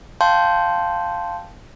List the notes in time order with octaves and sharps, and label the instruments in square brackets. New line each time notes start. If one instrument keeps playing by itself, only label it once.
[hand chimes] F5 G5 A5 C6 G6